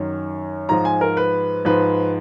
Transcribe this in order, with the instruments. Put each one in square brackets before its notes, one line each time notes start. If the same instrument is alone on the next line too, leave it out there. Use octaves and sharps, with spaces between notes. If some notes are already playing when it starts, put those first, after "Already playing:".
Already playing: [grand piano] F#2 D#3 F#3
G#2 F3 A#5
G#5
A#4
B4
G#2 F3 B4